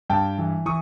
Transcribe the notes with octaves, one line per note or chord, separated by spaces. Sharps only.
G2 G5 A5
E3
E3 C#6 D#6